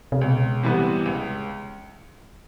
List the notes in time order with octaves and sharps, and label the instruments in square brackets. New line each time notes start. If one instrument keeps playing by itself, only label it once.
[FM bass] C3
[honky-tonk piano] C#2 [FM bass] B2
[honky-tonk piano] C3 E3 G3 B3
C#2